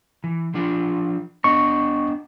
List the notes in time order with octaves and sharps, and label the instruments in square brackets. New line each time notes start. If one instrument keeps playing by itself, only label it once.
[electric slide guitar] E3
F3 D4 F4
[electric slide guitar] B3 D4 D#5 [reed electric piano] C#6